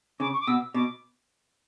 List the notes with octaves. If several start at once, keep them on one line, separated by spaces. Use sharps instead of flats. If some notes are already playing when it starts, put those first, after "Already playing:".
C#3 D6
C#6
D6
B2 E6
B2 D6